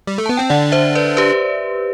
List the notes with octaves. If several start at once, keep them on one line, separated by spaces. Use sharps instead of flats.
G3
A3
B3 A5
C4 G5
D3 D4 D5 F#5
C5 E5
B4 D5
G4 B4